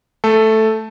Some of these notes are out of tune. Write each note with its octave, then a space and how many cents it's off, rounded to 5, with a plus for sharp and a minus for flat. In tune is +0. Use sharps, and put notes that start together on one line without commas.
A3 +0 A4 +0